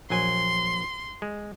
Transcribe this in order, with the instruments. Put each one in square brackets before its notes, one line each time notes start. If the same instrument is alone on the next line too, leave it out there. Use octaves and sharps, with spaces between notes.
[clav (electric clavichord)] A#1 F#3 G#5 [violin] C6
[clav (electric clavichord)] G#3